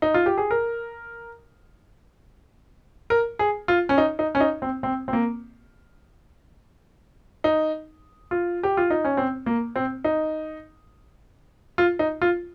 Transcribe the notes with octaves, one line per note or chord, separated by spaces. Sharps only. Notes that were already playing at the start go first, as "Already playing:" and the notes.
D#4
F4
G4
G#4
A#4
A#4
G#4
F4
C#4
D#4
D#4
C#4
D#4
C4
C4
C4
A#3
D#4
F4
G4
F4
D#4
C#4
C4
A#3
C4
D#4
F4
D#4
F4